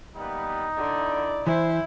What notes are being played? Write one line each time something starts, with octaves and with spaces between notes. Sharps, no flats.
G3 A#3 B3 D#4
D3 E4 D5
E3 E4 C5